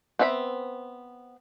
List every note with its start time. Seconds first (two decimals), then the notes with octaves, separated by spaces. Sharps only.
0.19 B3 C4 E5 A5 B5